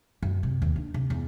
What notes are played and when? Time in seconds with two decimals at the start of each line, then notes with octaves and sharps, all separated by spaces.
0.22 F#2
0.43 C3
0.62 D#2
0.76 D4
0.94 C3
1.10 E2